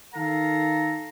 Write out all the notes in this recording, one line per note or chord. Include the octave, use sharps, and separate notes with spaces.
D#3 A4 F5 A#5